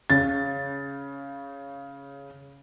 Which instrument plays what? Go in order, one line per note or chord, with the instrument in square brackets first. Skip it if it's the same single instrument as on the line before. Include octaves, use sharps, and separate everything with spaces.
[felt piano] C#3 A6